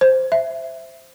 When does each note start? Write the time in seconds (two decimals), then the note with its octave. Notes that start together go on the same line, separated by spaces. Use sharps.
0.01 C5
0.32 E5